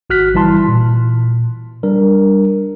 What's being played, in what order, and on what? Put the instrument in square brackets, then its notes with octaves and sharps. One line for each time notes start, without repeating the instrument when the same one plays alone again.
[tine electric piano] G#1 F#4 F6 F#6 B6
G1 E3 G3 E4 A5 C6
A#2
G3 D4 A#4